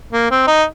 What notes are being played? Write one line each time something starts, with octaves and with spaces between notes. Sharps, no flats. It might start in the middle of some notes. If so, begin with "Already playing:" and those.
A#3
C4
D#4